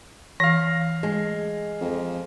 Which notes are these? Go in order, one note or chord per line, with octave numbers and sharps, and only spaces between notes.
E3 F5 A#6
G#3
F2